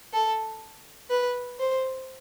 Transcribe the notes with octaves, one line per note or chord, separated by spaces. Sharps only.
A4
B4
C5